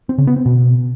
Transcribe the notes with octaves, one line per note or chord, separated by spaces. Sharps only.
C4
C#3
B3
C4
B2